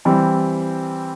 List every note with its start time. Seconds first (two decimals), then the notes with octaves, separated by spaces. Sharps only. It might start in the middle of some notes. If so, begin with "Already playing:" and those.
0.05 E3 G3 C4